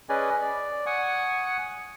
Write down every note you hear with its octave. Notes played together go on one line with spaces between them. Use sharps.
C#4 G#4 B4 D5 D#5 G#5
D5
F#5 G#5 C#6 D#6